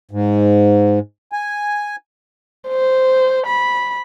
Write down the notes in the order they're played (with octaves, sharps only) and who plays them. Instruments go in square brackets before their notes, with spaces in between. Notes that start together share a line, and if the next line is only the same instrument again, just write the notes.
[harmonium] G#2
G#5
[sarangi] C5
B5